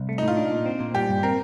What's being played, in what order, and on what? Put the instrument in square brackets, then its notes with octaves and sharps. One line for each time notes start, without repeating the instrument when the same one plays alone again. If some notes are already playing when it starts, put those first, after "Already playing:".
Already playing: [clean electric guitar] C2
A3
[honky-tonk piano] D#4
[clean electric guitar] A2
[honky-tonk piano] F4
[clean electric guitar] D4
A#2
C4
A#2
[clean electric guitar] G3 [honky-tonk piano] G4
[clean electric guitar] G2
[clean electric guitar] C4 [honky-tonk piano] A#4